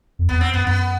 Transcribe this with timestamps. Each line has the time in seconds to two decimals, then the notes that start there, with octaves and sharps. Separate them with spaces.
0.19 F2
0.29 E2 B3
0.41 C4
0.53 F#2 B3
0.66 F#2 B3